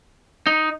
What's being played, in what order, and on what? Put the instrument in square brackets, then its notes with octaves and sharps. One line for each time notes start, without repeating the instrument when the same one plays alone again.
[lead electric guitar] D#4